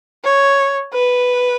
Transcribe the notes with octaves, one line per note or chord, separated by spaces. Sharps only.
C#5
B4